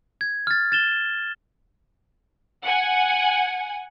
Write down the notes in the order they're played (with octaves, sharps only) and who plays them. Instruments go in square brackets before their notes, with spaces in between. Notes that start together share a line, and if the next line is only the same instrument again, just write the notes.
[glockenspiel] G#6
F6 A6
A6 E7 G7
[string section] F#5 G#5